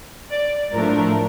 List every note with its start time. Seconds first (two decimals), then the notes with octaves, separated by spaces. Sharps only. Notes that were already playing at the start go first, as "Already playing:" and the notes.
0.30 D5
0.73 A2 F3 A3 D4 A#4